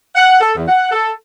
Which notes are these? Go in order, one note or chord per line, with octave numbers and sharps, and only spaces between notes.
F#5
A4
E2
F#5
A4